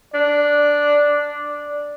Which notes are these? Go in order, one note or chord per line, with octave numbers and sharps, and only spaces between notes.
D4 D5